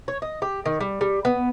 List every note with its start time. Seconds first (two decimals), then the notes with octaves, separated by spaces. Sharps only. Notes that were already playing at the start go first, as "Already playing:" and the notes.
0.08 C#5
0.22 D#5
0.42 G4
0.66 D#3
0.80 G3
1.01 G3
1.25 B3